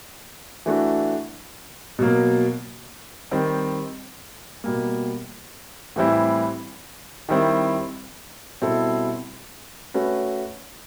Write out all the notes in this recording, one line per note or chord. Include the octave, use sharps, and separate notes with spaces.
E3 A3 D4 F#4
B2 F#3 A#3
D#3 G3 C4
B2 G3 A#3
A2 E3 G3 C4 E4
D#3 G3 C4 E4
B2 G3 C4 E4 A4
A3 C#4 F#4 B4